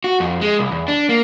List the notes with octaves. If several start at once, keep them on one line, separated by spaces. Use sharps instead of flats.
F#4
F2
G#3
C2
E2
D4
A#3